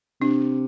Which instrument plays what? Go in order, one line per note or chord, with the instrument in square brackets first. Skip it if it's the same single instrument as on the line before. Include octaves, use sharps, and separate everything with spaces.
[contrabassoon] C3 [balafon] D4